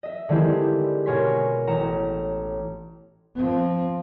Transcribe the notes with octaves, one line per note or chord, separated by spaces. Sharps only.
D#5 E5
D3 D#3 G#3 C4 E4 G4
B2 A#4 C#5 G#5 C6 B6
A1 G5 A#5 C#7 E7
F3 C4